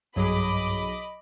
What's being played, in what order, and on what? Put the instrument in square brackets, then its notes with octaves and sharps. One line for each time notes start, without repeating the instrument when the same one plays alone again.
[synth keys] B1 F#3 G#4 [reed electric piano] G2 [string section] D#5 B5 D6